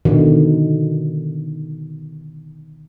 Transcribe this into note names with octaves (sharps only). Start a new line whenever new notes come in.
B2 D3 D#3